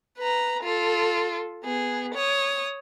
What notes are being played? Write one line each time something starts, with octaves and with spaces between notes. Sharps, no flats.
B4 A#5
F4 A4
B3 G#4
C#5 D#6